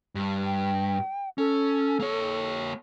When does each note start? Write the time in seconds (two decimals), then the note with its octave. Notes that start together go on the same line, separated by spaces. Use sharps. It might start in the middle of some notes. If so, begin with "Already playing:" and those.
0.15 G2
0.44 G5
1.38 C#4 A4
2.00 A#3 C#5